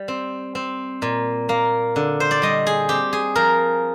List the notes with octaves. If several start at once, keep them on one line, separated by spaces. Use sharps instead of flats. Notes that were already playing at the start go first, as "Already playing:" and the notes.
Already playing: G3
C4
C4
A#2
A#3
D3
C5
D5
G3 D#5
G#4
C4 G4
G#4
F3 A#4